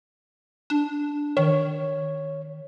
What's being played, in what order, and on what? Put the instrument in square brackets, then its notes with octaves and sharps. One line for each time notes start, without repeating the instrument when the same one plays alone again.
[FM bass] D4
[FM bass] D#3 [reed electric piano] C#5